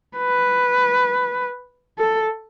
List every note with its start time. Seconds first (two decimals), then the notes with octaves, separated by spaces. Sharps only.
0.17 B4
1.98 A4